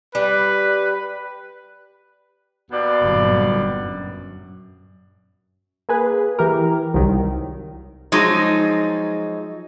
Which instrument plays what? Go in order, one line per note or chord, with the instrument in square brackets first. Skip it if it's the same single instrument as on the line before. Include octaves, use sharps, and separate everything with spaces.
[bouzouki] G3 [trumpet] B4
[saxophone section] D#2 B2 D5
[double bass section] G1 A#2 F#3
F#2
[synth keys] A#3 G#4 B4
E3 G4 A#4
C2 D#3 F#3
[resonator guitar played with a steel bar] F3 F#3 G#3 D#4